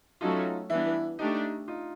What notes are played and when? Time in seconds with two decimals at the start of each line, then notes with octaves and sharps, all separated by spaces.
0.21 F#3 A3 C#4 D#4 F4 F#4 A4
0.70 E3 G3 B3 D4 E4
1.19 A3 D4 D#4 G4
1.68 D#4 F4